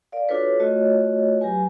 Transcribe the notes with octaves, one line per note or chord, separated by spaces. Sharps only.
A#4 D5 F5
D4 F4 F#4 A4 B4 C#5
A3 F4 F#4 C#5 D#5
F#3 G4 B4 G#5